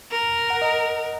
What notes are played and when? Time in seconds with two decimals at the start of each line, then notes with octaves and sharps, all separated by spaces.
0.12 A#4
0.50 F#5
0.62 D#5